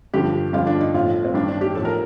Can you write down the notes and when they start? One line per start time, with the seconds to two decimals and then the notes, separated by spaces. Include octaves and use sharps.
0.14 G2 D3 F3 G4
0.53 G2 D3 F3 F4
0.67 D4
0.81 D#4
0.94 A2 F3 F4
1.25 C4
1.34 G2 D#3 D4
1.48 D4
1.61 G4
1.75 A2 F3 A4
1.85 A#4